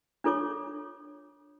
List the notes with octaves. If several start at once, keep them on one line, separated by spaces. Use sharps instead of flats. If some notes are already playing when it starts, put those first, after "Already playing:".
D4 F4 A4 C#5 D6